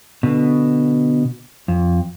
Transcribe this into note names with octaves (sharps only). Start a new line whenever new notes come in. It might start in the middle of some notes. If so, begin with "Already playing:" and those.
B2 D3
F2